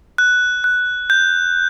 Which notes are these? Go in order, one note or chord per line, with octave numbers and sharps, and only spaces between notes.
F#6
F#6
G6